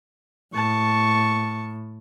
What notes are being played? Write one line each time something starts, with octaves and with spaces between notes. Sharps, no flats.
A2 A5 C#6